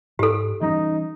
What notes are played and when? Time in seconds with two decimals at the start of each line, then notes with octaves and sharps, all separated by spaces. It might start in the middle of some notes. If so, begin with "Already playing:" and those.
0.19 G#2 G4 A4
0.61 E3 G3 C#4 D#4